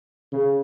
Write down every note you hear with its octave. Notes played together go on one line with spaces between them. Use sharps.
C#3